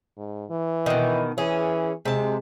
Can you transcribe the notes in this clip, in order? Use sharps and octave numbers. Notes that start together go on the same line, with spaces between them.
G#2
E3
B2 D#3
E3 C#4 G#4
C3 G#3 A5